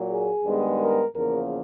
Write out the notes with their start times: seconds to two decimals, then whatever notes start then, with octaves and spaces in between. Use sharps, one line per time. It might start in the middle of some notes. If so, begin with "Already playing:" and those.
Already playing: A#2 F#3 A#3
0.09 G#4
0.44 G2 D#3 G#3 B3
0.80 A#4
1.15 E2 C#3 F3 A#3 A#4